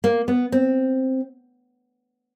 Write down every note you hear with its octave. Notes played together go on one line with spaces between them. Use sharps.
A#3
B3
C4